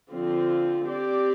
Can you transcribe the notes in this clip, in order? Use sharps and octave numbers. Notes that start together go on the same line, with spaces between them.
D3 F3 C4 F4
C4 G4 D5